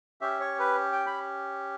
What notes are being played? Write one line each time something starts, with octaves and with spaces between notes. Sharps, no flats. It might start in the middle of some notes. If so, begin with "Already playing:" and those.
C#4 G4 E5
C#5
B4
G5
B5